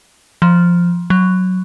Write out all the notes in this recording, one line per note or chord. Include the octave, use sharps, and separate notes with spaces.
F3
F#3